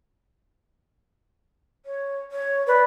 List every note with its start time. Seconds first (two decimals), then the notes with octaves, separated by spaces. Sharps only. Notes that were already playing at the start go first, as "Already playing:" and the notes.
1.86 C#5
2.32 C#5
2.67 B4 D5